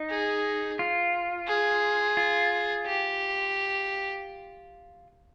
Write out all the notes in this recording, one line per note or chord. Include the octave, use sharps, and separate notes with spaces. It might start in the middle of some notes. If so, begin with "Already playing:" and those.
Already playing: D#4
G#4
F4
G#4
F4
G4